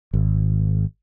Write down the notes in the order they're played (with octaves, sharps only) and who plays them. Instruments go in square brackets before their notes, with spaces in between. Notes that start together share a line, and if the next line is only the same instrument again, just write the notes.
[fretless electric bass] G#1